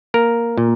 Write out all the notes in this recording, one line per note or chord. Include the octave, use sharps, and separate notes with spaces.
A#3 A#4
A#2